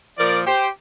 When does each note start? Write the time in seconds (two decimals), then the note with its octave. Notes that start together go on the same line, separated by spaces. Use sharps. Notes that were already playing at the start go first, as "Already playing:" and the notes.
0.18 A#2 F3 A#4 D5
0.46 G4 C5